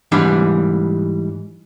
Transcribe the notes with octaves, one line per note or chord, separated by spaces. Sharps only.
G#2 E3 G3 D4